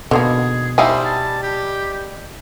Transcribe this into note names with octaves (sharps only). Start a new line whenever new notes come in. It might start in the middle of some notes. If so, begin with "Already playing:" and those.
B2 D3 D#3 A#3 G#4
G3 D#4 E4 C5 F5 G5 G#5
A5
G4